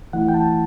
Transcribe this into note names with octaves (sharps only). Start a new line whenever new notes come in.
E3 A3 E4 F#5
G5
A5